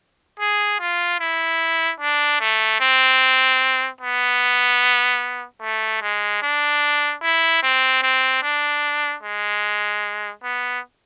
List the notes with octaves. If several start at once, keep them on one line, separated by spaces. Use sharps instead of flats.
G#4
F4
E4
D4
A3
C4
B3
A3
G#3
D4
E4
C4
C4
D4
G#3
B3